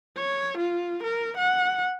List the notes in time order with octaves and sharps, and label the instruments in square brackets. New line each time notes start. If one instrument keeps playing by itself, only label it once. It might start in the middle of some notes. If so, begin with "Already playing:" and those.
[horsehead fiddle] C#5
F4
A#4
F#5